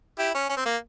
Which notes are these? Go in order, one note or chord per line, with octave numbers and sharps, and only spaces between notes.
E4 G4
C#4
C#4
C4
A#3